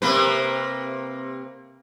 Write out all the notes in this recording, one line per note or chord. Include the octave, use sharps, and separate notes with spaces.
C3 A#3 B4